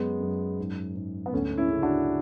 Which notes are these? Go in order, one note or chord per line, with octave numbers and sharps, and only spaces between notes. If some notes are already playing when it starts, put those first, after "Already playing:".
Already playing: F#2 G#3 B3
F#2
G#2
G#2
B3
D2 A3 C#4
C#4 E4
C#3
D4 F#4